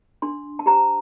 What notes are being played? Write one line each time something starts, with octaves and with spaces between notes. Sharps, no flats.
D4 C6
A5
G4 C5 A#5